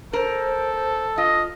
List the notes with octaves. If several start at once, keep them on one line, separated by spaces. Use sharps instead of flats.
A4 A#4 C5
F4 D#5